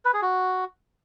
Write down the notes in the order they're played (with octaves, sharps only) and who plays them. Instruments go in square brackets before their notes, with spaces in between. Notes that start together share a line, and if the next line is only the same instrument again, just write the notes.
[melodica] B4
G#4
F#4